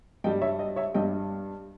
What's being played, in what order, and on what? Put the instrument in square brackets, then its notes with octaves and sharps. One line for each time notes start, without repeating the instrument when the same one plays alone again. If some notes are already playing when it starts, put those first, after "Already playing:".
[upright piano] G2 G3 D#5 G5
C#5 E5
D#5
C#5 E5
G2 G3 D#5 G5